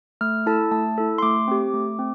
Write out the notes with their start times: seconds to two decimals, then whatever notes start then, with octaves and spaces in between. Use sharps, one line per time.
0.21 A3 F6
0.46 E4 A4 A5
0.71 A3 A5
0.98 E4 A4
1.18 C6
1.22 A3 D6
1.48 C4 G4
1.74 A3
1.99 C4